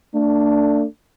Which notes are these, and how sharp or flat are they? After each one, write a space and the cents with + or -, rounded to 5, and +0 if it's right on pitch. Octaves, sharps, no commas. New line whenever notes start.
A3 +35 D4 +0